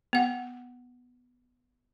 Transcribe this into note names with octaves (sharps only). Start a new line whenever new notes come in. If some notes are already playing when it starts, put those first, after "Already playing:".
B3 F#5